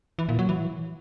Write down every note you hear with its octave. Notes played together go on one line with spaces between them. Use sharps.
E3
A#2
F#3
E3